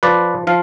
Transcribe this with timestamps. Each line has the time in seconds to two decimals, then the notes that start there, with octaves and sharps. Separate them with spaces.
0.03 F3 B4 D5
0.47 F3 F5